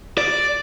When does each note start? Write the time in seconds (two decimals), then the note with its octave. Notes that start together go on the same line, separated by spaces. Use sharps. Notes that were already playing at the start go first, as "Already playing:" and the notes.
0.18 D5